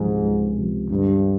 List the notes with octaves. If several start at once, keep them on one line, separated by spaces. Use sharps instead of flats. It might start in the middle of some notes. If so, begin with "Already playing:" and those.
Already playing: C#2 G#2 C3 F3
C#2
C3 F3
G2 D3